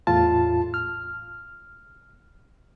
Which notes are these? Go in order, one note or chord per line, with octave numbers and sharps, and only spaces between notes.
E2 A2 F4 A5
F6